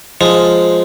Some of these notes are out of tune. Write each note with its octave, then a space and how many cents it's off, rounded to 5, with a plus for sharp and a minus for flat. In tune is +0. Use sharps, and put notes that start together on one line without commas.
F3 +0 G#3 +0